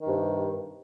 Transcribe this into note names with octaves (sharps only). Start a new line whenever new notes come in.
G2 C3 D#3